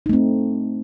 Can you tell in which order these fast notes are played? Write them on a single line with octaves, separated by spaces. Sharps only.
D#4 A3 C4